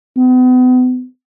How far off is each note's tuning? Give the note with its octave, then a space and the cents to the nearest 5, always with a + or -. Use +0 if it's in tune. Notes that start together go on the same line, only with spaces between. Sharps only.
B3 +40